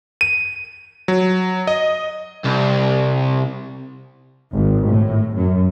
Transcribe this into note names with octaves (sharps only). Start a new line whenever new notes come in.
D#7
F#3
D#5
C2
G#1
A2
F#2